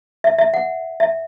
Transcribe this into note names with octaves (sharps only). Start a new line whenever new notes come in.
E5
E5
F#5
E5